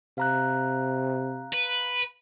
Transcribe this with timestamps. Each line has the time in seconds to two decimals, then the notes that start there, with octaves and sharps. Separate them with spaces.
0.18 C3 F5 A#5 F#6
1.53 B4